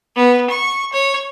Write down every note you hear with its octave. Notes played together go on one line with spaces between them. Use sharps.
B3
C#6
C#5